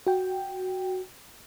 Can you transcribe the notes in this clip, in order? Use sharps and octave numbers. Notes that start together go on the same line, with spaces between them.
F#4 G5